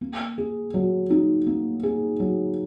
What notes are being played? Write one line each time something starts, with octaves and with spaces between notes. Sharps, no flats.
A#3
G#4
F#3
D#4
A#3
G#4
F#3